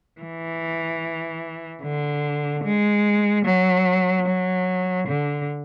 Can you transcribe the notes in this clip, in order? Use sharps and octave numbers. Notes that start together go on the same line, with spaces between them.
E3
D3
G#3
F#3
F#3
D3